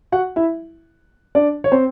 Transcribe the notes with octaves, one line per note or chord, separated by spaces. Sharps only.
F#4 F#5
E4 E5
D4 D5
C#5
C4 C5